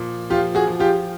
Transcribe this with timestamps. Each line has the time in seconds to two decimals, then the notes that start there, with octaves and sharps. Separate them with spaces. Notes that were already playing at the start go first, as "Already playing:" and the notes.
Already playing: A#2 F3
0.30 F3 F4 G4
0.55 F#4 G#4
0.67 F3
0.80 F4 G4